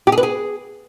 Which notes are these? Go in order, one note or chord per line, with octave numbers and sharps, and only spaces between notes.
G4
G#4
B4
G#4